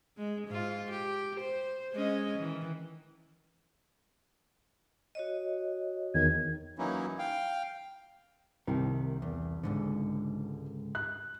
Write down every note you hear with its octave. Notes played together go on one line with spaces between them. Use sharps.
G#3
G#2 F4
G4
C5
G#3 C#4 D#5
D#3 E3
F#4 C#5 D#5
E2 D#3 G#6
E3 F#3 A#3 C#4 D#4 E4
F5 G5
C2 C3 D#3
E2
C#2 G#2 D3
F#6